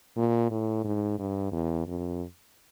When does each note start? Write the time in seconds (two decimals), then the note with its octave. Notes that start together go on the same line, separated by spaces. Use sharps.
0.16 A#2
0.51 A2
0.84 G#2
1.19 G2
1.52 E2
1.87 F2